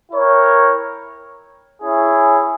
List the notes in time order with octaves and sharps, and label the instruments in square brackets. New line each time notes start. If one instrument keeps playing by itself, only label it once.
[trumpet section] E4 A#4 C#5 G5
C#4 E4 G#4